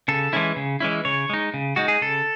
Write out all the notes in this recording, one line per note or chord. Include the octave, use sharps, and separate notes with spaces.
C#3 A4
E3 G#3 C#4 E4
C#3
E3 G#3 C#4 E4
C#3 C#5
G#3 D#4
C#3
G#3 D#4 F#4
G#4
C#3 A4